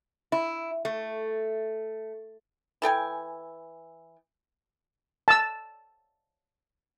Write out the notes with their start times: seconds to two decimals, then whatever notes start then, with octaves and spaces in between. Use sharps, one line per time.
0.32 E4
0.85 A3
2.82 E3 A4 G5 G#5
5.28 A5 E6